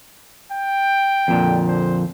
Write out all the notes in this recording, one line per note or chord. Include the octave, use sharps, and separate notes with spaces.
G5
F2 A#2 D3
C5